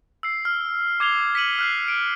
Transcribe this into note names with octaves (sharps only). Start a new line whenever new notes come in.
E6 C7
F6
D6 G#6 C7 F7 G7
B6 C#7 D#7 F#7
F6 F#6 C7
D7